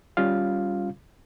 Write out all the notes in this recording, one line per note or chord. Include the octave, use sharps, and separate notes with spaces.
G3 C#4 F4 F5